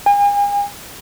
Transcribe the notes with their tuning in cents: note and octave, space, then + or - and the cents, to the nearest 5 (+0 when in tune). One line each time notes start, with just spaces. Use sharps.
G#5 -40